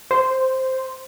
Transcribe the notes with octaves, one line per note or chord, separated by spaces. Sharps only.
C5